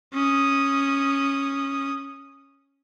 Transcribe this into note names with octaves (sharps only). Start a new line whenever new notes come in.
C#4 D#6